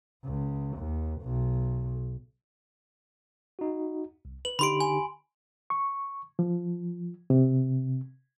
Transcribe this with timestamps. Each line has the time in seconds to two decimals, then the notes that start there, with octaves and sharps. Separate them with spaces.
0.25 C#2
0.78 D#2
1.22 B1
3.59 D#4 F#4
4.25 C2
4.45 B4 F#7
4.59 D3 D#4 G4 B5 C6 D7
4.80 G#5
5.70 C#6
6.39 F3
7.30 C3